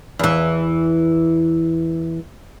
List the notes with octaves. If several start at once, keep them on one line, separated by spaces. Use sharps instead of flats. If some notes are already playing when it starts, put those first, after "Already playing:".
E2 E3